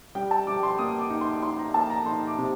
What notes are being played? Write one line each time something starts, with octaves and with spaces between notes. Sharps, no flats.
G3 G5
A5
G3 D6
C6
A#3 D#6
D6
D#4
C6
D#4 C6
A#5
A#3 A5
A#5
D#4 C6
D6
C3